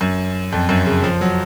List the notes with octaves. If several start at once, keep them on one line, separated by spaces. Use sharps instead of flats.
F#2
F2
F#2
C#3
F3
F#3